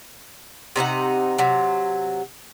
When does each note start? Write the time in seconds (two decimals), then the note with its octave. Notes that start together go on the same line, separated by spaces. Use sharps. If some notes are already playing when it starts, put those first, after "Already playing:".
0.76 C3 D#4 A#4 F#5
1.38 C3 F#3